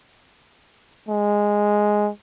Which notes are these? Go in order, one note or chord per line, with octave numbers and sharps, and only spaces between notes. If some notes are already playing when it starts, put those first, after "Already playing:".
G#3